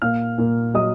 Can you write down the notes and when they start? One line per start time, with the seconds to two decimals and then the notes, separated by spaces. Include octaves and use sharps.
0.02 A#2 F5 F6
0.38 A#2
0.74 F#3 D#5 D#6